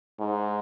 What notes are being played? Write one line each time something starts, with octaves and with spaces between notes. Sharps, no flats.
G#2